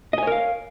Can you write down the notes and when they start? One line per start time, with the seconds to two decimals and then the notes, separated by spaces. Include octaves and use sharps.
0.13 D#5
0.18 G#5
0.23 C#5
0.27 A#4
0.32 F5